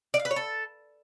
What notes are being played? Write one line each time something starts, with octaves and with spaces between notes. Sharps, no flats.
D5
F5
B4
C#5
A4